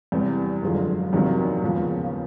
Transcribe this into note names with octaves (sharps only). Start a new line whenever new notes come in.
E2 C3 E3 G3
F#1 F#2 D3 F3 G#3
E2 C3 D#3 F#3 A#3
D#2 C#3 F3 G#3 B3